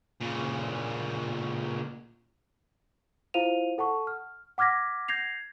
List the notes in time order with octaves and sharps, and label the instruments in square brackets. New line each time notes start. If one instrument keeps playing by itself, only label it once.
[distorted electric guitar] A#2 C#3
[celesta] E4 F4 C5 F5 D#7 F7
A4 F#5 A5 C#6
F6
F#5 D6 F6 G#6 A#6 B6
G6 G#6 A#6 C7 F7